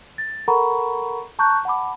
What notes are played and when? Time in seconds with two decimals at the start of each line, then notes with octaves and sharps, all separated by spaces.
0.18 A6
0.48 A4 A#4 F#5 A#5 B5 C#6
1.39 A5 A#5 C#6 F#6 G6
1.65 F#5 A5 B5 D6